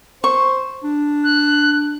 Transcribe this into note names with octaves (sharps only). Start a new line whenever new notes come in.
C5 C#6
D4
F#6